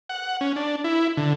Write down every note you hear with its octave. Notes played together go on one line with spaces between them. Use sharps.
F#5
C#4
D4
E4
D3